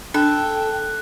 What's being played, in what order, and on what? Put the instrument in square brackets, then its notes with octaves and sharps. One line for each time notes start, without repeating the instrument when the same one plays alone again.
[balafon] D4 [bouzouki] A4 [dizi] G5 [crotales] F#6